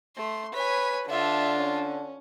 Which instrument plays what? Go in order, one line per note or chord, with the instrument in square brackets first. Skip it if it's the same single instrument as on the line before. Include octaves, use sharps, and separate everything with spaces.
[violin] A3 [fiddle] C6
[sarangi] B4 [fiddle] C#5 G#5 [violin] B6
[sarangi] D3 [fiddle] D4 F4 [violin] E5
[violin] C#4